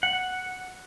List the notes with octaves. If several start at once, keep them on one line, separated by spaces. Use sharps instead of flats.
F#5